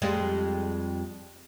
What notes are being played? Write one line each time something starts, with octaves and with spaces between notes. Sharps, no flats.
F2 G3 G#3